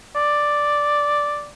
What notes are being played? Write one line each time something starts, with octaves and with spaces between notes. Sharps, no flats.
D5